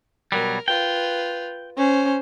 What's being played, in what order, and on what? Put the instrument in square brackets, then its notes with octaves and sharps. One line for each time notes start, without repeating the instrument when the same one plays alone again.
[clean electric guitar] B2 F#3 G3 [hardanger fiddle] A#4
[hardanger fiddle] F4 B4 [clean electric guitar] G5
[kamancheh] C#4 [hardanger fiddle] C5